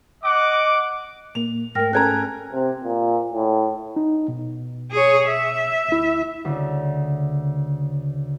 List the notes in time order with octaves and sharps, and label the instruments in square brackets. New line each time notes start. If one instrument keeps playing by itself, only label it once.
[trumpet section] D#5 F#5 D6
[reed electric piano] A#2 A#3 [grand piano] F7
[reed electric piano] G#2 A3 [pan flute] A#4 [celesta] G5 F6 A#6
[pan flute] C#4 [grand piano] A4 A#4 A#5 [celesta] F#6 G#6
[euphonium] C3
A#2
A2
[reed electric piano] D#4
B2
[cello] G#4 C#5
E5
[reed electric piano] D2 E4
[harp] D2 C#3